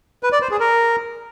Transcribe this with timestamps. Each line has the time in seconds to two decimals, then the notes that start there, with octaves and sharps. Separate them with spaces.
0.23 B4
0.32 D5
0.42 C5
0.51 G#4
0.60 A#4